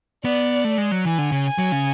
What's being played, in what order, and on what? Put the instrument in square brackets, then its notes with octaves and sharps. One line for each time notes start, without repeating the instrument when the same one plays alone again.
[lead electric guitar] B3 [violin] D5
[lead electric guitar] A3
G#3
F#3
[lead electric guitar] E3 [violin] G#5
[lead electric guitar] D3
C#3
[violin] G#5
[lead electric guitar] F#3
C#3